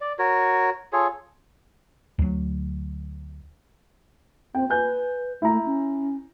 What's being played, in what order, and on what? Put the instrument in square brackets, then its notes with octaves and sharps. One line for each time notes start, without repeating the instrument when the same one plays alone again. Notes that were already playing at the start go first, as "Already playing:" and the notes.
[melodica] D5
F#4 A#4 C#5
F4 G#4 A4 C#5
[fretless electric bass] D2 F#3
[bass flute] C4 [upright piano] G5
[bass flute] B4 [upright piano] G#5 G6
[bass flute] A3 [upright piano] E4 A#5
[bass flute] C#4